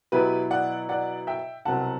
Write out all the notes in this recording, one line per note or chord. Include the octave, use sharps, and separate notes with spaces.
B2 F#3 B3 E4 G4 B4
D5 F#5
D5 F#5
E5 G5
C2 B2 F#3 C4 F#5 A5